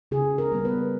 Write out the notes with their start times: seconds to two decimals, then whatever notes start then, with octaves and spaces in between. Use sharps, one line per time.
0.11 C#3 G#4
0.38 A#4
0.52 G3 B3
0.65 B4